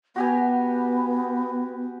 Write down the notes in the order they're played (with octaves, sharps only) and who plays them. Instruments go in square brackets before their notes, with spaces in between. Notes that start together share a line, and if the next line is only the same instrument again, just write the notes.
[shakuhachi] B3 [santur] F#4 G4 G#5